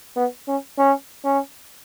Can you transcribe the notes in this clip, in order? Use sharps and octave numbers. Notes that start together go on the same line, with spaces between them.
B3
C#4
C#4
C#4